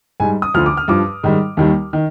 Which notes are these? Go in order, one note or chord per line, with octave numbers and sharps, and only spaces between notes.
G#2 G3 G#5
D#6
D2 D3 F3 F6
D6
F6
G2 F3 D6
G#2 D#3 G3
D#2 D#3 G3
D#3